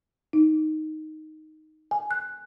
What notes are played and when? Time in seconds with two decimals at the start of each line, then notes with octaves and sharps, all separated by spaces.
0.33 D#4
1.91 G#5
2.11 F#6